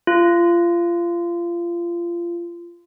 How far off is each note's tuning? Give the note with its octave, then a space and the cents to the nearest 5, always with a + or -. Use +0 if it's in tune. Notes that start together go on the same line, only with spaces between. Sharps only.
F4 -25